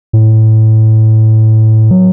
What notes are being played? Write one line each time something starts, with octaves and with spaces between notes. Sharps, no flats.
A2
F#3